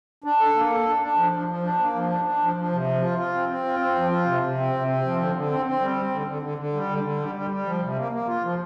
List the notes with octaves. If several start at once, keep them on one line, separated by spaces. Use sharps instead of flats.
D4
A4
A#3
A4
D4
D4
F3
F3
F3
D4
A#3
F3
D4
D4
F3
F3
C3
F3
F4
F4
C4
C4
F4
C4
F3
F4
C3
C3
C4
C3
C4
F3
D3
D3
C4
C4
G3
C4
D3
D3
D3
D3
G3
D3
D3
G3
G3
G3
F3
C3
A#3
A#3
F4
F3